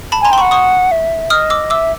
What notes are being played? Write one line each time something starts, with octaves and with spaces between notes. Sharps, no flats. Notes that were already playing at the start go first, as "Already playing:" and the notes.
A5 B5
G#5 A#5 C6
G5 C6
F#5 B5 C#6
C#6 D#6
E5
D#5 D#6 F6
D6 E6
E5 D6 E6